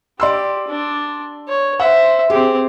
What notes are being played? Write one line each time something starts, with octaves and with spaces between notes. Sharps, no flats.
G4 D5 C6 E6
D4
C#5
C5 E5 F#5
C4 G4 G#4